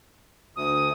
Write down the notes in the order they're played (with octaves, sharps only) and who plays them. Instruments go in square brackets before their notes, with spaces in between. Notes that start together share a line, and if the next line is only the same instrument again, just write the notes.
[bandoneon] D2 [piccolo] D#6